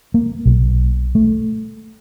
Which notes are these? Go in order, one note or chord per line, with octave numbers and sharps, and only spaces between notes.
A#3
B1
A3